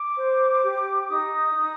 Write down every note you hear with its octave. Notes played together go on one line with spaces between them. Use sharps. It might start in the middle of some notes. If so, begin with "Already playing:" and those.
Already playing: D6
C5
G4
D#4 D#6
D#4